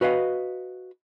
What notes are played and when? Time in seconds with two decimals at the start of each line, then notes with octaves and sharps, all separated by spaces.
0.01 F#4 B4 D#5 F5